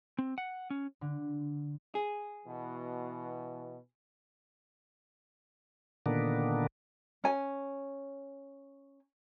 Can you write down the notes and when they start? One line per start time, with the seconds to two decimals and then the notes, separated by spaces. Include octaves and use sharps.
0.19 C4
0.38 F#5
0.70 C#4
1.01 D3
1.95 G#4
2.46 B2 E3
6.06 A#2 D3 D#3 A#3 B3 D4
7.24 C#4 G#5